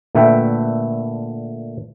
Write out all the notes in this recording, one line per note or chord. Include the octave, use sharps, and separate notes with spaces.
A#2 D3 A3 B4 E5 G5